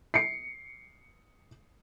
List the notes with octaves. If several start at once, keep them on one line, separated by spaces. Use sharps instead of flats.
C7 C#7